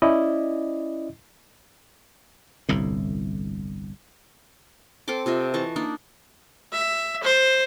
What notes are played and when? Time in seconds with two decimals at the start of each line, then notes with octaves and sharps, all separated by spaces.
0.02 C#4 E4 D5 D#5
2.69 G1 C2 A2
5.08 C4 A4 C6 D6
5.26 C3 F4 D#5 E5
5.54 E3 D#5 A5 C#6
5.76 A#3 D4 D#4
6.73 E5
7.23 C5